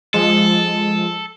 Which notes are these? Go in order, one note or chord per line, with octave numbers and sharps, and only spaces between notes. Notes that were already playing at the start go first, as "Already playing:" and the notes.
F3 G#3 A4